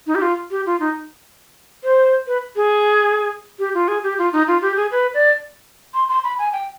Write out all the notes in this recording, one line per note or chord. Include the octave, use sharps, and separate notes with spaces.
D#4
G4
F4
G4
F4
D#4
C5
B4
G#4
G4
F4
G#4
G4
F4
D#4
F4
G4
G#4
B4
D5
C6
C6
B5
G#5
G5